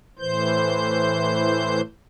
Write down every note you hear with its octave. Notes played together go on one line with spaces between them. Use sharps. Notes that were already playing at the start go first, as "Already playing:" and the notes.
A2 E3 C5 G6